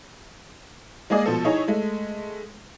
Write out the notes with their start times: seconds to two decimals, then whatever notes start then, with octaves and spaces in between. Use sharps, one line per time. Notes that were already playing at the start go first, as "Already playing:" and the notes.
1.10 G#3 A#3 G#4 D5 D#5
1.26 B2 F3 A4
1.45 D#4 E4 G#4 C#5
1.68 G#3 A3